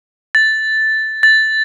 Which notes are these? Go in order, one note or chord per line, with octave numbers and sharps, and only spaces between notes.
A6
A6